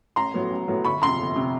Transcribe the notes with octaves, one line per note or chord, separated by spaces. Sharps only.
A1 A#5 C6
A2 F#3 B3
A1
A2 F#3 B3
G1 B5 C#6
F2 C3 A#5 C6
G1
C3